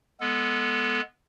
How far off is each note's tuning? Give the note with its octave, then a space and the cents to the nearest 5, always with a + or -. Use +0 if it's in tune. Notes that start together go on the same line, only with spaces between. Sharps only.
G#3 +0 B3 -10 A4 +0